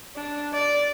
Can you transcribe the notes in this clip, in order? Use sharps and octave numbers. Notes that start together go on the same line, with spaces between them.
D4
D5